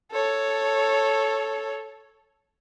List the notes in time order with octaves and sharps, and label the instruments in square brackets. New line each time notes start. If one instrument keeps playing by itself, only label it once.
[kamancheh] A4 C#5